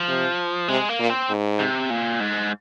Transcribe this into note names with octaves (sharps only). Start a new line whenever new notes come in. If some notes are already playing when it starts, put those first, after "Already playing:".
Already playing: F3
C3
C3 G#3
A#3
A#2
C4
G#2
C3
A#2
G#2